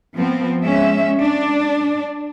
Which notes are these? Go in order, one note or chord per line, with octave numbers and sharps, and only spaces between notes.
F3 B3 C4
G#3 C#4 E5
D4